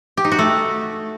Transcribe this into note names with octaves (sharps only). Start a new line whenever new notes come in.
G4
D#4
F#4
A3